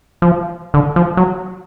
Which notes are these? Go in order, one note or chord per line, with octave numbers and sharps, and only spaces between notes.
F3
D3
F3
F#3